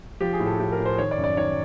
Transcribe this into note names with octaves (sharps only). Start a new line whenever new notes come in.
F3 G4
G#4
A2
A4
A2 G4
A#4
A2
C5
D#3 C#5
D5
F#2
D5
D#3 C#5